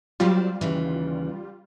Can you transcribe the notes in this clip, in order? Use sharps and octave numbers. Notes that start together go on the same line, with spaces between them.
F#3 G3 C4 F4 A4
D#2 C#3 E3